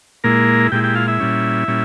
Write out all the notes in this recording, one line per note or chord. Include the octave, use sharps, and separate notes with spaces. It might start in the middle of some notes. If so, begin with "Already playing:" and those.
A#2 G#3 A#3 E4 A#4
A#2 G#3 E4 G4 G5
G4 G5
F4 F5
E4 E5
A#2 G3 C#4
A#2 G3 C#4